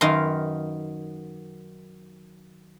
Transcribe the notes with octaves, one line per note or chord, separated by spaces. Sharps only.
F#2 D#3 B4 F5 A#5 C6